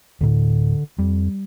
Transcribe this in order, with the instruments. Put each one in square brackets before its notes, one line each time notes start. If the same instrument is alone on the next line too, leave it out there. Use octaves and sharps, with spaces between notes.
[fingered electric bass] D1 A2 [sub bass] D3
[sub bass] F2 [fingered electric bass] G3